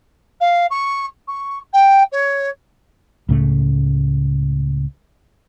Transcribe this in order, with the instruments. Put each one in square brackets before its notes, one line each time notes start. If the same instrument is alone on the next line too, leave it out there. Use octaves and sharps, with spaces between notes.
[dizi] F5
C#6
C#6
G5
C#5
[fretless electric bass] C#2 A2 C#3 A3